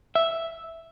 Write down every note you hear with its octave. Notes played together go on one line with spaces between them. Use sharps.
E5